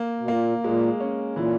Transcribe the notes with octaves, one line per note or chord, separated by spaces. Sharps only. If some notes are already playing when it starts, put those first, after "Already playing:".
Already playing: A#3
B2
A#2 A#3
A#2 G#3
C#4
A#2 E3